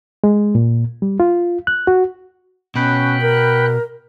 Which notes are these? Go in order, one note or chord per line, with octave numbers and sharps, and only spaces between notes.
G#3
A#2
G3
F4
F#6
F#4
B2 C#4 G5 B5 F#6
A#4